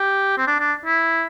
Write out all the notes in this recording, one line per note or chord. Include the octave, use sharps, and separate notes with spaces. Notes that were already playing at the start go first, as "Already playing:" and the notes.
Already playing: G4
C4
D4
D4
E4